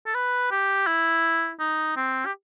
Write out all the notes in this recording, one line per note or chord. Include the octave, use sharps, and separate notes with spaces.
A4
B4
G4
E4
D#4
C4
G4